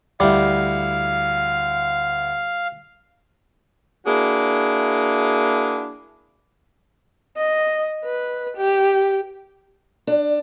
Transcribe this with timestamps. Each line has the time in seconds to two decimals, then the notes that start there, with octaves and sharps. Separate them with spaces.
0.20 D2 G3 E4 F5
4.06 A#3 D4 E4 F#4 G#4
7.36 D#5
8.04 B4
8.57 G4
10.07 D4